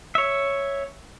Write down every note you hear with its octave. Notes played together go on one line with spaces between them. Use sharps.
C#5 E5